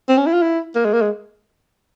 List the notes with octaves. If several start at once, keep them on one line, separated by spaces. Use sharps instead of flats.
C4
C#4
E4
F4
E4
A#3
G#3
A#3
G#3